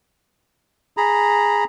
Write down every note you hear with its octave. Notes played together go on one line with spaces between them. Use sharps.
G#4 A#5 B5